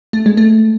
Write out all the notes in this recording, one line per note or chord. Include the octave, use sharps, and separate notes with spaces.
A3
G#3
A3